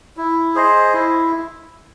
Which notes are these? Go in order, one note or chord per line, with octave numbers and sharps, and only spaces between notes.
E4
G#4 C5 D#5
E4